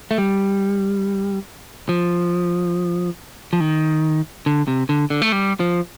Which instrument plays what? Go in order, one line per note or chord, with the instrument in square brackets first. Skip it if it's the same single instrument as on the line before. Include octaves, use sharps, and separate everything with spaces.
[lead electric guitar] A3
G3
F3
F3
D#3
D3
C3
D3
D3
A3
G3
F3